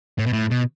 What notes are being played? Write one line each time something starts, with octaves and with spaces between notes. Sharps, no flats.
A2
B2
A2
B2